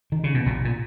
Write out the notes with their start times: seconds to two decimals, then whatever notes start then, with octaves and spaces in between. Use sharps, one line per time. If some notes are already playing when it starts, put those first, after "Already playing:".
0.12 D#3
0.24 C#3
0.34 B2
0.46 A#1 A#2
0.65 A#2